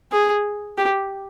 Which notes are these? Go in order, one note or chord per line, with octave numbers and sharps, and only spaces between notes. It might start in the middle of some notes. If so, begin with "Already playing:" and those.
G#4
G4